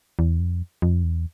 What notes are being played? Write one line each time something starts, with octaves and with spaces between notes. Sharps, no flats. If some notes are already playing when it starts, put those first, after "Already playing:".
E2
F2
F2
E2